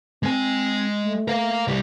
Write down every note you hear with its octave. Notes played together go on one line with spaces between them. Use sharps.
G#3 C4 G#5
A3
A#4 F5
C2 G3